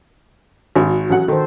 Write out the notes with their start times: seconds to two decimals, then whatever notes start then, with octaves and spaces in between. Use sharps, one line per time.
0.75 G#1 F#4
1.10 A1 F#3 F#5
1.28 D#3 A4 C5